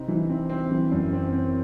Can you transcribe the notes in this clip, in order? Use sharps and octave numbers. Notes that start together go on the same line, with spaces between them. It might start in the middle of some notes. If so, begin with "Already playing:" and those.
Already playing: C3 C4 D#4
E3
C4
C4
E3
F#2
C4
C4